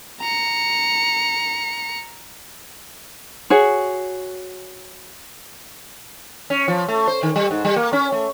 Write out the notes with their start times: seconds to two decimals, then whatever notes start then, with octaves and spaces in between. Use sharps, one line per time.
0.21 A#5 C#7
3.50 F#4 G#4 C#5
6.50 C#4
6.68 F3
6.89 A3
7.07 C5
7.23 D#3
7.36 G3
7.51 G#2
7.65 G3
7.76 A#3
7.93 C#4
8.12 A3